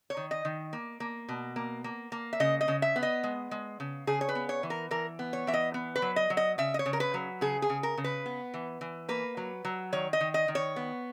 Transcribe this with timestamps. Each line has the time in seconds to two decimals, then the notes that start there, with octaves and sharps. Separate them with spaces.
0.10 C#5
0.17 D#3
0.31 D#5
0.45 D#3
0.73 A#3
1.00 A#3
1.29 B2
1.56 A#3
1.84 A#3
2.12 A#3
2.33 E5
2.40 C#3 D#5
2.61 D#5
2.68 C#3
2.82 E5
2.96 B3
3.03 D#5
3.23 G#3
3.51 G#3
3.80 C#3
4.07 C#3 G#4
4.21 C#5
4.29 B4
4.35 B3
4.49 C#5
4.63 E3
4.70 A#4
4.91 E3 A#4
5.19 B3
5.33 C#5
5.47 E3 E5
5.54 D#5
5.74 B3
5.96 B4
6.02 F#3
6.16 D#5
6.30 F#3
6.37 D#5
6.58 C#3 E5
6.74 D#5
6.79 C#5
6.86 C#3
6.93 A#4
7.00 B4
7.14 F#3
7.41 C#3 G#4
7.62 G#4
7.70 C#3
7.83 A#4
7.98 C#3
8.04 B4
8.26 B3
8.54 E3
8.81 E3
9.09 A#3 B4
9.37 F#3
9.65 F#3
9.92 D#3 C#5
10.13 D#5
10.21 D#3
10.34 D#5
10.48 D#3
10.55 C#5
10.76 B3